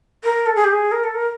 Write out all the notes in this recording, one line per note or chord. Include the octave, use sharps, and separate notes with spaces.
A#4
A4
G#4
G4
G#4
A#4
A4
A#4